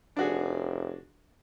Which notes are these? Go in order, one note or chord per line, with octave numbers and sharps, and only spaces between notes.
F1 D4 F#4 G#4